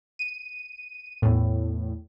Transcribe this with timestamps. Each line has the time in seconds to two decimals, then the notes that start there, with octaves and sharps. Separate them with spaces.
0.19 D#7
1.22 E2 A2